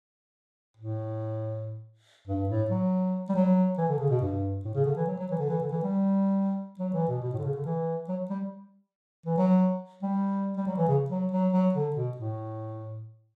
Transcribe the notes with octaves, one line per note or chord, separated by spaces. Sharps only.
A2
G2
A2
F#3
G3
F#3
E3
D3
C#3
B2
G2
A2
C#3
D3
E3
F#3
F#3
E3
D3
E3
D3
E3
G3
F#3
E3
B2
B2
A2
D3
C#3
D3
E3
F#3
G3
E3
F#3
G3
G3
F#3
E3
C#3
F#3
F#3
F#3
D3
B2
A2